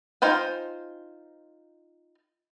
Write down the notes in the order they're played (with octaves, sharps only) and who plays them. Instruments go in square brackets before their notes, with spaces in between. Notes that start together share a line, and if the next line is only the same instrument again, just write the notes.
[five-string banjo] D#4 F4 C5 G5 G#5